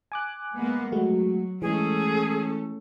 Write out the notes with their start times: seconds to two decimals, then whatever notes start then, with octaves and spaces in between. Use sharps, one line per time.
0.12 G#5 D6 F#6
0.55 G#3 A#3 B3
0.92 F#3 G#3 A3 F#4
1.62 E3 G#3 A3 C#4 G#4 A4